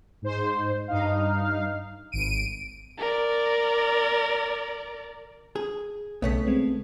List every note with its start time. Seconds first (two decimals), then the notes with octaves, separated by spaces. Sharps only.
0.22 G#2 C5
0.88 G2 D#4 F5
2.12 G#1 D7 D#7
2.99 A#4 D5
5.56 G#4
6.22 B1 C#3 A3 B3 C#5 B6
6.47 G#3 C4